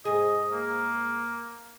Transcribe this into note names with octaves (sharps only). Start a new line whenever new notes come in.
G#2 G#4 D#5
A#3